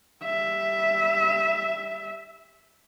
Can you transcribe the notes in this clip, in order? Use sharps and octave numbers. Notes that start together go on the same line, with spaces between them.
G3 E5